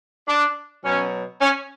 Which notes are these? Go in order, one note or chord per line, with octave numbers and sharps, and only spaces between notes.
D4
B2 F#3 C#4
C#4